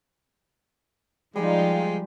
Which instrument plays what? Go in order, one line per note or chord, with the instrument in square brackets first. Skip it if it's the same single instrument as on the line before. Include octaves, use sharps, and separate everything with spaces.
[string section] F3 D#4 F4 [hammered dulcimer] G3 G4 G#5 [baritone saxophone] G#3